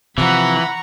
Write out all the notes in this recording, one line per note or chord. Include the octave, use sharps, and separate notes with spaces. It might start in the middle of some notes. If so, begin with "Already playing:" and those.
C3 E3 F3 F#5 A#5 B5 C#6